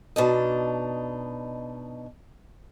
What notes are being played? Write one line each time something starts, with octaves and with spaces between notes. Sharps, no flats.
B2 D4 D#4